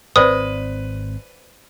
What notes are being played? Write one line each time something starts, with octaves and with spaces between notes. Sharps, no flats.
G#1 B2 C4 B4 C5 D5 E5 D#6